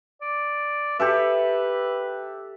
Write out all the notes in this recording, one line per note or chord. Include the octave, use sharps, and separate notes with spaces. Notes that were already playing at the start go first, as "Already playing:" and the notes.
D5
G4 A4 B4 E5